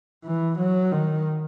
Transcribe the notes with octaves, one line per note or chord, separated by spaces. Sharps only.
E3
F#3
D#3